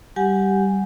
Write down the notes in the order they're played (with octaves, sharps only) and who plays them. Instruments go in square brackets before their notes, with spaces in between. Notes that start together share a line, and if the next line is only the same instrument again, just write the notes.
[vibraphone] G3 G4 F#5 G#5